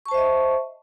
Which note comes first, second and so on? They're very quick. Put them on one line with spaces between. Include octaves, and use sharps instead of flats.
C#6 A5 C5 E5 D#5